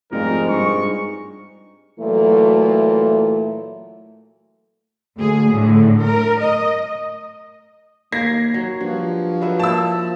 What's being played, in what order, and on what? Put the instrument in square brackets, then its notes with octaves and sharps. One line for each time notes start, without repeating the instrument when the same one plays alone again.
[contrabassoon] F1 [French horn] G#2 [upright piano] G3 D#4 F4 [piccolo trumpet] A#4
[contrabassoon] G2 [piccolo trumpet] C#6
[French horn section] A#2 E3 F#3 A3
[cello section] D2 G#4
A2 D3
A#4
D#5
[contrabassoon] D#2 [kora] A#3 [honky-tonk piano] G#6 A#6 C7
[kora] F#3
[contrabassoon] G2 [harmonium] F3 [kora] F#4
[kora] F#3 B4 E5
[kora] A#3 E4 [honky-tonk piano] A5 E6